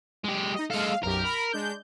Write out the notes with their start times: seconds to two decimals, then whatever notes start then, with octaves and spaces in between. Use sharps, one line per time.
0.24 G#3 G4
0.54 D#4 D#5
0.70 G#3 A4 F5
1.03 B1 F#2 G4 A#4
1.23 B5
1.53 G#3 D4 G6